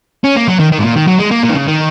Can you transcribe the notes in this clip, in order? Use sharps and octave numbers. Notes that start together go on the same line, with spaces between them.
C#4
A#3
F#3
D#3
D#3
G#2
A#2
D#3
F#3
G#3
A#3
A#2
D#3
C#3
D#3